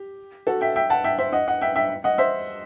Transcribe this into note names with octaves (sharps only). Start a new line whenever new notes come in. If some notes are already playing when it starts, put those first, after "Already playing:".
Already playing: G4
F#4 A4
E5 G5
E5 G5
F#5 A5
E5 G5
C5 E5
D#5 F#5
D#5 F#5
E5 G5
E5 G5
D#5 F#5
C5 E5